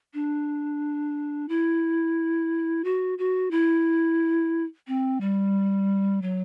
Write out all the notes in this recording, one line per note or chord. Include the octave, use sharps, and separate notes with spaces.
D4
E4
F#4
F#4
E4
C4
G3
F#3